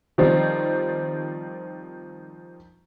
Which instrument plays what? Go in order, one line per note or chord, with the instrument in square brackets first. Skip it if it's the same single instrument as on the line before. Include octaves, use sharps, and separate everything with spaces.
[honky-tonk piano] D#3 F3 G3 C4